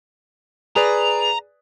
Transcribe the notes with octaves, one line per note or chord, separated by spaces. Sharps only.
G#4 B4 D5 A#5